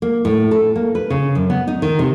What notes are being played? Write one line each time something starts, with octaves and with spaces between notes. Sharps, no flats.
A#3
A2
A4
A#3
B4
C#3
F#2
B3
D#4
D#3
C3